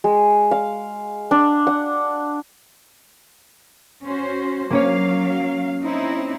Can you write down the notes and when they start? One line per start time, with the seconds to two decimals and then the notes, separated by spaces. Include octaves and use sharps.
0.04 G#3
0.51 F5
1.31 D4
1.67 F#5
4.03 C#4 F#4 C5
4.70 F#3 A#3 C#4 C#5 F5
5.84 C4 D#4 E4